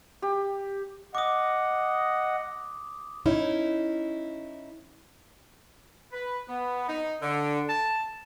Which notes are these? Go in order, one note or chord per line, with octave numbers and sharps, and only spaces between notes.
G4
D#5 F#5 D6 D#6
C#4 D#4 E4
B4
B3
D#4
D3
A5